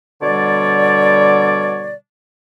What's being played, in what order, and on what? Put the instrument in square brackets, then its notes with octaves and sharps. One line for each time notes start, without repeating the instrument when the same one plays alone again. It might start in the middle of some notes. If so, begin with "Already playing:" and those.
[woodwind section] B2 D3 G3 C#5 D5